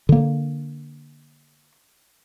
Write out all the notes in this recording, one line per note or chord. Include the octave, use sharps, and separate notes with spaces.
D3 A#3